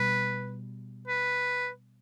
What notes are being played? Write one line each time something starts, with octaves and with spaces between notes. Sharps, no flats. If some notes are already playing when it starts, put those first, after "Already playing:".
Already playing: B2 G3 B4
B4